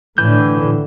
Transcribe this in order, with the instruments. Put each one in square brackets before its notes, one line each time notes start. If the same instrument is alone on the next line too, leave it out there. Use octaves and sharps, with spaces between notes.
[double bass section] A2 D3 [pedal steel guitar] E3 G6